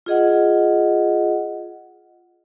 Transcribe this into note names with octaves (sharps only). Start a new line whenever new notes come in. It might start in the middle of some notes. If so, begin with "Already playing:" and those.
F4 G#4 D#5 F#5